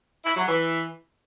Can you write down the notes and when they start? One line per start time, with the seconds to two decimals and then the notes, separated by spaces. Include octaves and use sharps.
0.25 E4
0.36 F#3
0.47 E3